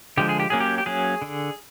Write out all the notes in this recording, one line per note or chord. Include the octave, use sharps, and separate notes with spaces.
D3 F3 G#3 G4
G#4
G4
F#3 A#3 C#4 G#4
G4
G4
F#3 A#3 C#4 G#4
D3